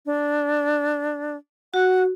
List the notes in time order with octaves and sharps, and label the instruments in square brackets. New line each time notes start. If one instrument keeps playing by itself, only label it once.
[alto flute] D4
[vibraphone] F#4 [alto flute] F#5